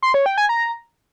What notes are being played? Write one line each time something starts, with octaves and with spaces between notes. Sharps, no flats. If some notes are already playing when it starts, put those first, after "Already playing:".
C6
C#5
G5
G#5
A#5